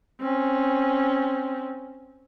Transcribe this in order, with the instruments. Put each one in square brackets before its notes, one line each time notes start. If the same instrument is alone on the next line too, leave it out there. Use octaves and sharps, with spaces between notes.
[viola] C4 C#4